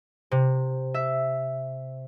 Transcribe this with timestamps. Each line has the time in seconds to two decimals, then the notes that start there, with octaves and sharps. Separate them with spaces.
0.31 C3
0.94 E5